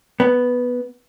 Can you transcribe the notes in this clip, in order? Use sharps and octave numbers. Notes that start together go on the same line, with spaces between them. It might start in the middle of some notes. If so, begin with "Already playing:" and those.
B3